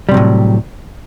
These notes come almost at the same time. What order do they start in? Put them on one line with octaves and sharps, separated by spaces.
G3 C3 F#3 A2